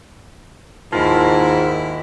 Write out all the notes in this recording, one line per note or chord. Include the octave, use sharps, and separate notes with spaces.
D#2 G#2 E4 F4 A#4 A5 B5